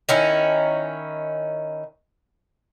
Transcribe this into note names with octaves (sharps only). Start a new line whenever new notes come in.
D#3 C#4 E4